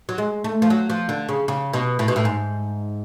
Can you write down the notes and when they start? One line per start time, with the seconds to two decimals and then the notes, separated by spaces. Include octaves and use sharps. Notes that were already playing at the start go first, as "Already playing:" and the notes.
0.09 F#3
0.18 G#3
0.44 A3
0.62 F3
0.70 F#3
0.90 F3
1.09 D3
1.29 C#3
1.48 C#3
1.73 B2
1.99 A2
2.08 B2
2.16 A2
2.25 G#2